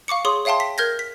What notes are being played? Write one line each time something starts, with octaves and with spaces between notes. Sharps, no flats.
F5 C#6 D6 C#7
G#4 C#5 C6 D6 D#6
C#5 E5 F5 G5 A5 C6
B6
A#4 F6 G6 G#6 A#6
B6